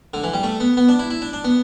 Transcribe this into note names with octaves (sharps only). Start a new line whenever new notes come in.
D3
E3
G3
A3
B3
B3
D4
E4
E4
D4
D4
B3